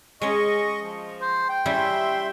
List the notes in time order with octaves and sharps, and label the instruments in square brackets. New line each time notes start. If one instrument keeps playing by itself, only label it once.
[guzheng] G#3 C#4 [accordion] D#5 C#6
[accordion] F3
[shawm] C5
G5
[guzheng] G3 C#4 E4 [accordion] E5 C6